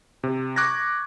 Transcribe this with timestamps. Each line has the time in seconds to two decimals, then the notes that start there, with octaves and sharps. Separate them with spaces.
0.23 C3
0.56 C#6 D6 F#6 G#6 A#6